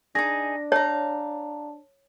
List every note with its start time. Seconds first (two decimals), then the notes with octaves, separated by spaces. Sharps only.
0.15 D4 D#4 G#4 A#6
0.72 C#5 F5 A5 A#5